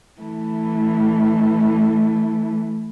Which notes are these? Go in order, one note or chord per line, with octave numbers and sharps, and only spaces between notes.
E3 A3